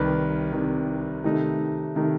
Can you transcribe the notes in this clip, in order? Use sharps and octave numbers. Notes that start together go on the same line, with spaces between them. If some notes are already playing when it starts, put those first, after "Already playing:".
Already playing: C2 C3 D#3 B4
C2 C3 D#3
C3 D#3 A3 D#4
C3 D#3 A3 D#4